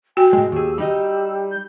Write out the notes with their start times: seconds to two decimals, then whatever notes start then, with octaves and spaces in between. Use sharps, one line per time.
0.17 F#4 G5 G#5
0.33 A2 G#3 D#5
0.52 D#2 G4 G#4 E6
0.78 G3 D#4 G4 D#5
1.51 G6